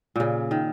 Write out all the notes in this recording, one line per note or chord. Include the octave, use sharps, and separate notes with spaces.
A#2 C#3
D#3